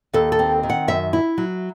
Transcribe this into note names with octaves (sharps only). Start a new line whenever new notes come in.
D#2 A4
A4
C4
D#3
F#5
F#2 E5
E4
F#3